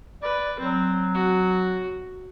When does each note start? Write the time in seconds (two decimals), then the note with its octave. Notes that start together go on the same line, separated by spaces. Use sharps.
0.22 B4 D5
0.60 F#3 C4
1.14 F#4